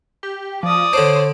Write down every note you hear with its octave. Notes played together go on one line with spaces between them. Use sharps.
G4
F3 D5 D#6
D3 D4 C5 C#5